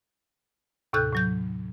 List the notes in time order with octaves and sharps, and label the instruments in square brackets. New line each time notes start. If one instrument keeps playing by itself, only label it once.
[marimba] D#2 A2 C3 A4 F#6 G6
A2 F#3 G6